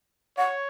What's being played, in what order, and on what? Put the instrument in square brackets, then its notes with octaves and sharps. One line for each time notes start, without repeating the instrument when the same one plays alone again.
[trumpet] C#5 [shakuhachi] F#5